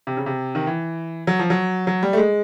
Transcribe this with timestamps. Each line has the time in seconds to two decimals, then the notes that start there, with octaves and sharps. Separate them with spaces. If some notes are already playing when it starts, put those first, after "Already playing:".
0.07 C3
0.17 C#3
0.26 C3
0.55 D#3
0.67 E3
1.27 F#3
1.39 F3
1.50 F#3
1.87 F#3
2.03 G3
2.13 A3
2.18 G#3